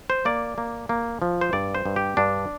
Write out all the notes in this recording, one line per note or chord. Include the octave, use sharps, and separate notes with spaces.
C5
A#3 D5
A#3
A#3
F3
C5
G2 D5
C5
G2
G4
G2 D4